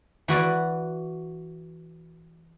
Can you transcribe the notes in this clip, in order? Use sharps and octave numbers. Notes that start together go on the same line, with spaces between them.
E3 F#4 B4 D5